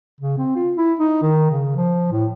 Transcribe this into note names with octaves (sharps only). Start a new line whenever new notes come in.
C#3
C4
F4
E4
D#4
D#3
C#3
F3
A2